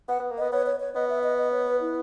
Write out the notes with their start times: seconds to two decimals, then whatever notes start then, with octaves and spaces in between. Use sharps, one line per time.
0.08 B3 F#5
0.19 B3
0.31 A#3
0.38 B3 D#5
0.52 B3 C#5
0.66 C#5
0.80 C#5
0.95 B3 D#5
1.10 E5
1.24 D#5
1.38 D#5
1.52 C#5
1.67 B4
1.81 E4